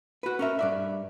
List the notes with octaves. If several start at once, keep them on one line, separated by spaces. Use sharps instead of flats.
F#4 B4
C#4 A#4 E5
G2 D5 E5